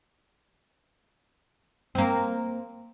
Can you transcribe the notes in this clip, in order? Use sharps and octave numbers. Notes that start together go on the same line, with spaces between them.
A#3 C4